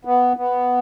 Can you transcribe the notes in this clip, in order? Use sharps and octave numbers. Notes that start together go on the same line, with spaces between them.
B3
B3